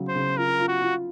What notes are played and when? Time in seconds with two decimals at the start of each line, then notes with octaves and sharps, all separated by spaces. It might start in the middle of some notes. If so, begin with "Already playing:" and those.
Already playing: C#3 F#3
0.09 C5
0.16 C#3
0.38 F4 A#4
0.60 F4
0.68 F#4
0.82 F4